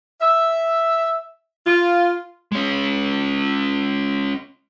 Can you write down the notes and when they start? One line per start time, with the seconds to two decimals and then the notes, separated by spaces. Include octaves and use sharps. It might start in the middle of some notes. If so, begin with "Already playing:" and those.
0.21 E5
1.66 F4
2.52 G#3 C#4